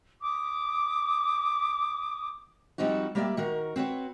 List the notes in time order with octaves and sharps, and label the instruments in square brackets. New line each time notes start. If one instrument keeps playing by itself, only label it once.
[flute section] D6 D#6
[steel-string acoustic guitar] F3 G3 C4 D#4 F#4
G3 A#3 G4 D5 E5
D#3 F#4 A#4
C4 F#4 B4 C#5